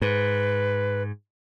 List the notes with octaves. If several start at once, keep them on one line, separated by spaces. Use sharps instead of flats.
G#2 B4